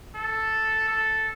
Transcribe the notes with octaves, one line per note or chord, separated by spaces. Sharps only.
A4
A4